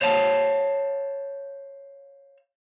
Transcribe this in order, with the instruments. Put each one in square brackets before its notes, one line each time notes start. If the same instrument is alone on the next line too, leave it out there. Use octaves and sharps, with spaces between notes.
[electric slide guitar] C5 C#5 F5 A5